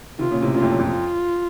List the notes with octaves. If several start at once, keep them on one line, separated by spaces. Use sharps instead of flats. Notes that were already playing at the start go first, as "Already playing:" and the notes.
C3 D#3 F4
A#2 C#3
A2 C3
F#2 A#2 F4
F2 A2
F#2
F2
F4